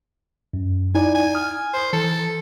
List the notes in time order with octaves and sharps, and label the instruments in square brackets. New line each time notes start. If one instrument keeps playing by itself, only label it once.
[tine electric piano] F#2
[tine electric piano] D#4 E4 D5 [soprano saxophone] G#5
[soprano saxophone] G#5
[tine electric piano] D#6 F6
[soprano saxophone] C5
[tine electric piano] E3 [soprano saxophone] A4